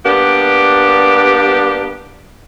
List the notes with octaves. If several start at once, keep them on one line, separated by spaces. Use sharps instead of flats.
G3 A#3 B3 D4 G4